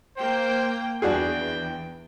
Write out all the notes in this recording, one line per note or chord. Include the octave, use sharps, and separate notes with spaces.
A#3 C5 G5
E2 D4 F#4 G#4 G5